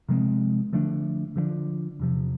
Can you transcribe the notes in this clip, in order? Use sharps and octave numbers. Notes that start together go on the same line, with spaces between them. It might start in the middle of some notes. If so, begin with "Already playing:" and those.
C3 F3 G#3 C4
D3 F3 A3 D4
D3 F3 A3 D4
E2 C3 F3